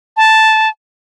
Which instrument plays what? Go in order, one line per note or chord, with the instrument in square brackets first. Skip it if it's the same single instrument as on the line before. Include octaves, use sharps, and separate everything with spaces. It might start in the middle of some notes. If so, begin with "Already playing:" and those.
[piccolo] A5